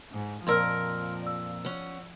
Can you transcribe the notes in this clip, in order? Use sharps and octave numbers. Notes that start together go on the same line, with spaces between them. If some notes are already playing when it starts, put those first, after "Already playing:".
G#2
F2 A#2 F3 A#4 C6 E6 F6
D5 E6
C#4 F#5